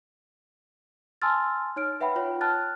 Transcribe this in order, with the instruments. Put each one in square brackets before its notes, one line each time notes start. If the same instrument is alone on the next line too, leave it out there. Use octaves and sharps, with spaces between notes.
[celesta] G#5 A5 C6 E6 F6 A6
D#4 C#5 F6 D7
B4 E5 F#5 G5 B5
F4 C#5 G5
A5 F6 F#6 A6